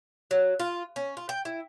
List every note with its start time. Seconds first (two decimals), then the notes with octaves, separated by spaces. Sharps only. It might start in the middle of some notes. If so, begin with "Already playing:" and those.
0.31 F#3
0.60 F4
0.96 C#4
1.17 F4
1.29 G5
1.45 E4